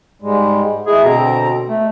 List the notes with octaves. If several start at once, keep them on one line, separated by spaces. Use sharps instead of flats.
G#2 G3 G#3
A3 E4 G#4 D#5
B2 D3 C4 A#5
B2 A3